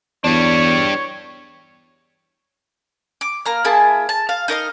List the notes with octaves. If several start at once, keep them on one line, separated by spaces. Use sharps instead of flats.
E2 G3 D4 C#5
D6
A#3 A#5 F6
A#3 E4 G#4 A5
A5
F5
D#4 A#4 D#5 F5